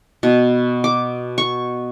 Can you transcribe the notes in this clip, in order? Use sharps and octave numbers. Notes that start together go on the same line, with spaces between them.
B2
D6
C#6